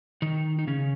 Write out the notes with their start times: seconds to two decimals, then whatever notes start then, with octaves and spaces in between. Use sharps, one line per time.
0.22 D#3 D#4
0.59 D#4
0.67 C#3 C#4